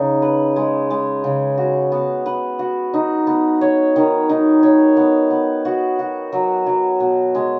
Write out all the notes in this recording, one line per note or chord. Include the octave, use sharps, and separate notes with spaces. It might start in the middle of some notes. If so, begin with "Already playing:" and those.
Already playing: C#3 D#4
B4
G#3
G#3
C#3
F#4
B3
B4
F#4
D#4
B3
C#5
D#3
D#4
C#5
B3
B3
F#4
F#4
F#3
F#3
B2
G#3